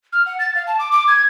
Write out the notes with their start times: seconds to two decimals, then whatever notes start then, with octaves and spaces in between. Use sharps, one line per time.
0.13 F6
0.26 F#5
0.39 A6
0.55 F5
0.67 A5
0.79 D6
0.92 D6
1.08 G#6